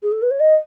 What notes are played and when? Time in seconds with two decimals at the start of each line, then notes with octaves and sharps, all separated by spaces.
0.02 G#4
0.12 A4
0.22 B4
0.30 C#5
0.40 D#5